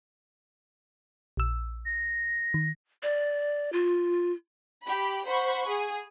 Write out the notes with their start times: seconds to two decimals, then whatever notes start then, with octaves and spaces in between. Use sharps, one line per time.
1.37 A#1 E6
1.86 A#6
2.54 D#3
3.03 D5
3.73 F4
4.85 G4 B5
5.26 C5 F#5 B5 C#6
5.67 G#4